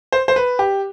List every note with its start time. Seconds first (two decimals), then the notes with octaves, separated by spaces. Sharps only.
0.12 C5
0.28 C5
0.36 B4
0.59 G4